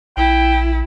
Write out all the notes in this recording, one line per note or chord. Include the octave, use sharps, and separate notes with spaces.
A#1 E4 G5